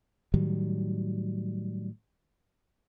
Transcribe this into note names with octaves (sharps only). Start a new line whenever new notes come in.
A2 D#3 F#3 G3